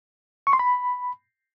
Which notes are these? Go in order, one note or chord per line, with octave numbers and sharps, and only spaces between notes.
C#6
C6
B5